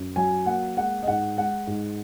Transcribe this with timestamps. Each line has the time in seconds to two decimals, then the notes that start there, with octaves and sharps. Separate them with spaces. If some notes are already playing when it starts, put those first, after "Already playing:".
Already playing: F#2
0.16 F#3 G#5
0.46 A#3 F#5
0.77 G#3 F#5
1.03 D#5
1.07 G#2 F#5
1.37 G#3 F#5
1.67 G#2